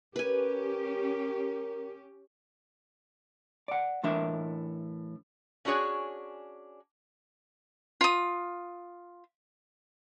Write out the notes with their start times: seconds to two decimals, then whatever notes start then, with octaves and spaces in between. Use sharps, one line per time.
0.16 C#4 G4 A#4 B4 G#5
3.68 D5 F#5
4.03 A2 E3 D4 A#4 E5
5.65 C#4 D4 F#4 G#4 C#5
8.01 F4 D#6